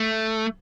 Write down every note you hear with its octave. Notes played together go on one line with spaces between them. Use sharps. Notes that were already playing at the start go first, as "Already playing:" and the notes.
Already playing: A3